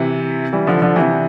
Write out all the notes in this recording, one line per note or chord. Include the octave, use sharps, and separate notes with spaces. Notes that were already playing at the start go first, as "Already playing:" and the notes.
Already playing: C3 E3
E3 G3
D3 F3
D3 F3
C3 E3